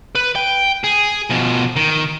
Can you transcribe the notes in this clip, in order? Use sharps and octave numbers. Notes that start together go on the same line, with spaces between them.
B4
G5
G#4
B2 F3
D#3